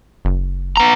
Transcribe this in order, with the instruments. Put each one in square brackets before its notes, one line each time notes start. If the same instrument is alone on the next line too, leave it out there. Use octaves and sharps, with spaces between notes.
[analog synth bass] F#1
[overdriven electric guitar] B3 A#5